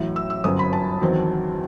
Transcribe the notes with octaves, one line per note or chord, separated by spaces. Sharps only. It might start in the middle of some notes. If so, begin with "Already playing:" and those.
Already playing: A1 A2 F#3
E6
E6
G1 F#2 F#3 C4 D#6
B5
A5
E2 D#3 F#3 C4